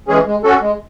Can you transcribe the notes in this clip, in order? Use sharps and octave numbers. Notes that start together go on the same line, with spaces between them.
E3 G#3 C#4 G#4
G#3
C#4 F#4 A4
G#3